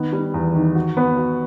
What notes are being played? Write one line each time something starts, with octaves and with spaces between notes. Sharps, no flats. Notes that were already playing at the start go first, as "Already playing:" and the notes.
Already playing: D#3 B3
G3
E2
D#3
F#4
B3
F#4